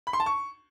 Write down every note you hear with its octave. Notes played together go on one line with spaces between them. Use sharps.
B5
C6
A5
C#6